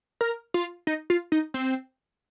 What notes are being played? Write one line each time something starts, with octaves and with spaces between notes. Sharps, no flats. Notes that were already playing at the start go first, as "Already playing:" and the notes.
A#4
F4
D#4
F4
D#4
C4